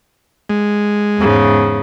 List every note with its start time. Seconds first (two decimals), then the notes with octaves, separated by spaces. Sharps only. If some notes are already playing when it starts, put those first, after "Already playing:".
0.50 G#3
1.18 E2 G#2 C#3